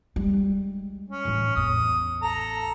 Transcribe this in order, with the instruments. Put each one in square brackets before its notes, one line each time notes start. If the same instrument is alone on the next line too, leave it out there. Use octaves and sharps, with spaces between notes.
[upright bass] G3 G#3
[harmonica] C#4
[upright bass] A2 E3
[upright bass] A1 E2 [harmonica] D#6
[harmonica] A4 A#5